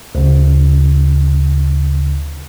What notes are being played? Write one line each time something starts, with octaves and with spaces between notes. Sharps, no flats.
D2 C#3